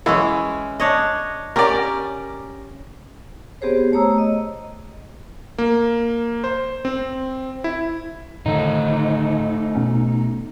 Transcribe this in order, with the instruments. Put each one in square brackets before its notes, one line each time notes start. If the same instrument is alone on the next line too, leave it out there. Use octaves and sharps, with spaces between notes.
[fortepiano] E3 E4 [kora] G#3 C#4
[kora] D4 C#5 D#5
[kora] C#4 G4 [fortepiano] A#4 D5
[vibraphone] B3 C4 G4 G#4 C5 C#5
A3 C#5 A#5 D#6 E6
D#5
[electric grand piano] A#3
C5
C4
E4
[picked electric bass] A2 D3 D#3 [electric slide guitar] A3 D#4
[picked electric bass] B2 B3 C#4